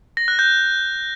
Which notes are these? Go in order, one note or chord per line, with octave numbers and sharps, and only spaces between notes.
A#6
F#6
G6